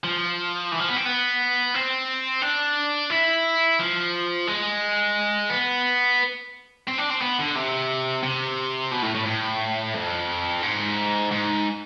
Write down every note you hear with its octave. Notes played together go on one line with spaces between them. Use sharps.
F3
E3
F3
B3
C4
B3
C4
D4
E4
F3
G#3
B3
C4
D4
C4
B3
D3
C3
C3
B2
A2
A2
A2
F2
G#2
G#2